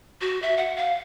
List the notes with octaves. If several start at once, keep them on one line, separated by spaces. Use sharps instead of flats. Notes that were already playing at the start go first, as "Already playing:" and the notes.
F#4
E5
F#5
F5